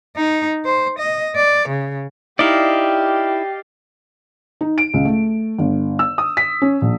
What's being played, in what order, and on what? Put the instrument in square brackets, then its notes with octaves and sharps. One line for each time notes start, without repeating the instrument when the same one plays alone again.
[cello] D#4
C5
D#5
D5
C#3
[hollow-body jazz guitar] D#4 E4 [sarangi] G4 [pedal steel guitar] D5 D#5 F5
[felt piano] D#4
D7
C#2
A3
G1
E6
D#6
B6
C#4
A#1